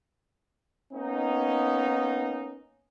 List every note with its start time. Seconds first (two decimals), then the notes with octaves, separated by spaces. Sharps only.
0.93 A#3 B3 C#4 D#4